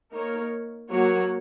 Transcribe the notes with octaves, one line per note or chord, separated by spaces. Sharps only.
A#3 D#4 A#4 C#5
F#3 A#3 F#4 C#5